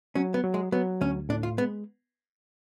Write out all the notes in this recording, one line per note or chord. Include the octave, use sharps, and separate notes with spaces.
F#3 C#4
B3
F#3
G#3
F#3 B3
D2 C#4
A2 D4
F4
G#3 B3